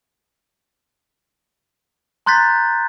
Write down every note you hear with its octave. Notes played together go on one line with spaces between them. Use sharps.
A#5 C6 F#6 G6 A6 B6